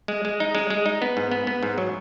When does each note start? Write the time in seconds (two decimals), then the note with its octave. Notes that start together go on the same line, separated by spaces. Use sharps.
0.08 G#3
0.25 G#3
0.40 D#4
0.55 G#3
0.70 G#3
0.86 D#4
1.02 B3
1.17 G#2
1.31 B3
1.47 B3
1.63 G#2
1.78 F#3